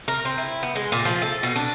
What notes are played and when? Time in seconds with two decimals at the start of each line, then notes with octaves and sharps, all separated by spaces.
0.08 A#4
0.25 C4
0.38 E4
0.63 B3
0.75 G#3
0.92 A#2
1.05 F3
1.22 A4
1.43 B2
1.56 D4